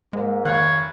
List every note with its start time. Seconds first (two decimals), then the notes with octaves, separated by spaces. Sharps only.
0.13 G#2 G#3 A#3
0.45 F1 D#3 C#5 F5 F#6